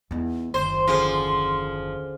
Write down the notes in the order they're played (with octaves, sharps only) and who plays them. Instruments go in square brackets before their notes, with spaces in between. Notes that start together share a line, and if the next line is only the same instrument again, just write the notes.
[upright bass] E2 D#4
[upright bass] F#1 D#2 [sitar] C5 [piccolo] C6
[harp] D3 C#4 G#4 [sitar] F3